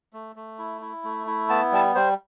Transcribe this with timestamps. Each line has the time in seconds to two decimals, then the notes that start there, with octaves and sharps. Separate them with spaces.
0.13 A3
0.36 A3
0.59 E4
0.81 E4
1.04 A3
1.27 E4
1.49 B3 A5
1.72 G3 A5
1.95 G3 C5